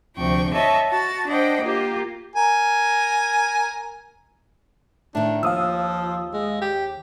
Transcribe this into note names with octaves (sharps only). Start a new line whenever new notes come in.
D2 C3 F3 G5 C#6
C#5 D#5 E5 A5 C#6
F#4 A5 A6
D4 C5 D#5 F#5 G5
A#3 F4 G4
A#4 G#5
A2 D#3 D4
D#2 F3 F5 D#6 E6
G#3
G4